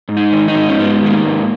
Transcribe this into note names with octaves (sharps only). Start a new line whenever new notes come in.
G#2
D#4
D#3
D#4
G#2
C#4
G#2 B3
D#3 G#3
A#3
G#2